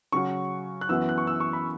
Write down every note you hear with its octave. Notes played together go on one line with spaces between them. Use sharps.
C#3 F#3 C#4 F#4 C#6
F#6
F#2 E3 B3 F#4 E6
F#6
C#6
E6
C#6
B5